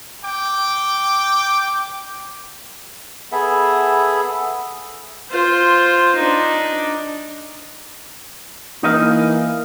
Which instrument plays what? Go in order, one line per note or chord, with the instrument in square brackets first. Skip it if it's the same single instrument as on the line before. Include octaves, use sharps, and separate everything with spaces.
[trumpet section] G5 D6
[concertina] B3 G#4 A4 E5
[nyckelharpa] F4 C5
D4 D#4
[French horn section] E3 A#3 [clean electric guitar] D#4 D#5 F5